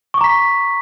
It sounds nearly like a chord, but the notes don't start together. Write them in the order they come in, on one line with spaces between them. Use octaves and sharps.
C#6 D6 A#5 B6